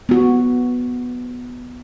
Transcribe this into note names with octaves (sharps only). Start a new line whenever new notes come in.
B3 F#4